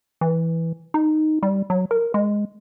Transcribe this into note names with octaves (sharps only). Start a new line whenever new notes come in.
E3
D#4
G3
F#3
A#4
G#3